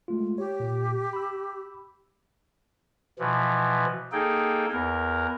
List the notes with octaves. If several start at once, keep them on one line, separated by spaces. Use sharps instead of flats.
G#3 A3 F4
G4 C#5
A#2
B5 E6
B2 E3 F3
A#3 D#4 G#4 A4 G5
E2 A#4